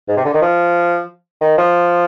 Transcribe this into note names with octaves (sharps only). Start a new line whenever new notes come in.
G#2
C3
D3
D#3
F3
D#3
F3